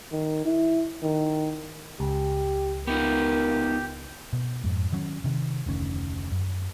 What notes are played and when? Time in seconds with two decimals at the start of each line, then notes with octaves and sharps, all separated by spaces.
0.12 D#3
0.45 E4
1.03 D#3
2.00 C#2 G4
2.87 B3 D#4 F4 G4 A#4
4.33 B2
4.64 F2 G#2
4.92 D#3 F#3 C#4
5.24 C3 D#3
5.66 F1 D2 D#3 C#4
6.32 F#2